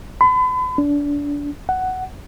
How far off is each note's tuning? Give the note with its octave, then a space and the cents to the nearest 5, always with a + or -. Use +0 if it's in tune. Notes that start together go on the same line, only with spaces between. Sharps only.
B5 +40
D4 -25
F#5 +10